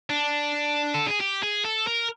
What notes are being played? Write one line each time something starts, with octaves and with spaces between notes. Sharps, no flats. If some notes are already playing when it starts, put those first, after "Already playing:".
D4
A4
G#4
G4
G#4
A4
A#4